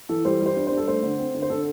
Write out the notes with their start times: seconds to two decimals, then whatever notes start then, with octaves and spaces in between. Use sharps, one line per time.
0.09 E3 A4
0.25 G3 C5
0.40 G3
0.46 C5
0.56 D4
0.67 D4 C5
0.77 A4
0.87 A3 C5
1.03 D3
1.19 C4
1.34 D3
1.42 C5
1.50 D3 A4